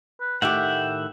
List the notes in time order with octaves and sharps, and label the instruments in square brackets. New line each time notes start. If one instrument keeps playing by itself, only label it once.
[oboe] B4
[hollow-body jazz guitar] A2 D#3 G4 [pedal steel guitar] E5 F#5 [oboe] G5